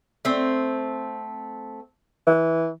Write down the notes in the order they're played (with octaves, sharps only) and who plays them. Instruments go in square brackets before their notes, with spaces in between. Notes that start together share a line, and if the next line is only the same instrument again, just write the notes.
[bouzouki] A3 C4
[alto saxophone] E3